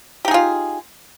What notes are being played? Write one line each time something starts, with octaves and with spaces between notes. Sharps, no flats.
D#4 F4 G4 G#4